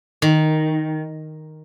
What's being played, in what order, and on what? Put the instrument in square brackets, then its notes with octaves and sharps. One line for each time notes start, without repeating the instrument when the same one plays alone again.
[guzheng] D#3